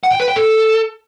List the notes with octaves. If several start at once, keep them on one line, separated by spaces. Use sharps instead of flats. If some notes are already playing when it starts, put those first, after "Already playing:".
F#5
G5
B4
G5
A4